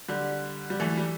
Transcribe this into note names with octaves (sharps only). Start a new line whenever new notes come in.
D3 G3
G3
E3 A3
G3